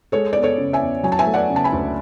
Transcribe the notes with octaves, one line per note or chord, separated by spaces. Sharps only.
G#3 A4 C#5
B3 D5
A4 C#5
C#3
E5 G#5
E2
F#3 G#5
A5
E5 G#5
A3
D5 F#5
C#3
A5
G#5 B5
D2